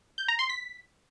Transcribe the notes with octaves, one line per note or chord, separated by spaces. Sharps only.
G6
A#5
C6
B6